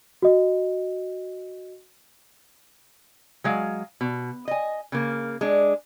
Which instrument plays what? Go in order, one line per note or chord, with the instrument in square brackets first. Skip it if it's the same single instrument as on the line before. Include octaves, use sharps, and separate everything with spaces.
[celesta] F#4 D#5
[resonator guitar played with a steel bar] F#3 G#3 F5
B2
D#5 G#5
C#3 A#3
G#3 D4